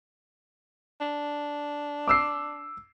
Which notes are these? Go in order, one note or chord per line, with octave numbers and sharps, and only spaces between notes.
D4
D6 E6 C7